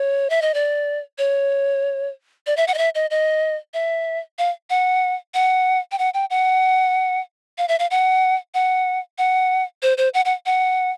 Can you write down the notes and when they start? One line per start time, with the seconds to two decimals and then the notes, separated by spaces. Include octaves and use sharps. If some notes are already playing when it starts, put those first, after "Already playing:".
Already playing: C#5
0.30 E5
0.42 D#5
0.54 D5
1.18 C#5
2.47 D5
2.57 E5
2.68 F#5
2.74 D#5
2.78 E5
2.95 D#5
3.11 D#5
3.74 E5
4.38 F5
4.70 F#5
5.34 F#5
5.92 G5
5.99 F#5
6.14 G5
6.30 F#5
7.58 F5
7.68 E5
7.79 F5
7.91 F#5
8.54 F#5
9.18 F#5
9.82 C5
9.98 C5
10.14 F#5
10.25 F#5
10.46 F#5